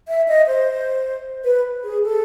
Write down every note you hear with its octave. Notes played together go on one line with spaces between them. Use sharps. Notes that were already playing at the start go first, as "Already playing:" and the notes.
E5
D#5
C5
B4
G#4
A4